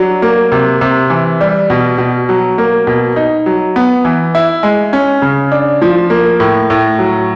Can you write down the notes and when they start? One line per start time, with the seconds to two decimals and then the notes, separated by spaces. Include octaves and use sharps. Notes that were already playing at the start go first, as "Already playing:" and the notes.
Already playing: F#3 D4
0.22 A#3
0.52 C3
0.81 C3
1.10 E3
1.41 G3
1.70 B2
1.98 B2
2.29 F#3
2.58 A#3
2.87 B2
3.16 D#4
3.46 F#3
3.76 B3
4.05 E3
4.35 E4
4.63 G#3
4.93 C#4
5.22 C#3
5.52 D4
5.82 F3
6.10 A#3
6.40 A2
6.70 A2
6.99 F#3